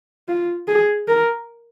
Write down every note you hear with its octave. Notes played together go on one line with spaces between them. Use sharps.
F4
G#4
A#4